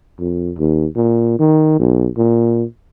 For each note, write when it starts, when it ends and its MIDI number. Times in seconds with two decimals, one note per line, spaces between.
0.19 0.53 41
0.58 0.86 39
0.96 1.35 46
1.39 1.76 51
1.79 2.09 35
2.17 2.64 46